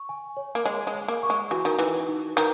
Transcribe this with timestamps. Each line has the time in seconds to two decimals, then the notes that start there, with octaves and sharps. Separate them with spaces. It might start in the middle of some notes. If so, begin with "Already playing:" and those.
Already playing: C#6
0.09 G#5
0.37 C#5
0.55 A#3
0.65 G#3 C#5
0.87 G#3
0.94 G#5
1.08 A#3
1.23 C#6
1.30 G#3
1.51 E3 F#4
1.65 D#3
1.79 E3 D#4
2.08 D#4
2.36 D#3 B4